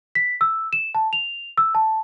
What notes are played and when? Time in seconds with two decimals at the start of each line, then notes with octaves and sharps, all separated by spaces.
0.15 B6
0.41 E6
0.73 E7
0.95 A5
1.13 F7
1.58 E6
1.75 A5